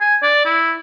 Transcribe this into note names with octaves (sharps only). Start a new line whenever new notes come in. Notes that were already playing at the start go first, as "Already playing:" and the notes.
G#5
D5
E4